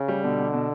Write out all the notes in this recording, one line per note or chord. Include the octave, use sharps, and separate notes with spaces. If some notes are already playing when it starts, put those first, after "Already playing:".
Already playing: C#3
G3
B2 D3
B2
B2